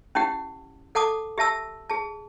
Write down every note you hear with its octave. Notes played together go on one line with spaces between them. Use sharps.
C#4 E4 G4 F#5
A4 F#5 A5 D6 D#6
G4 E5 A5 E6
G#4 A5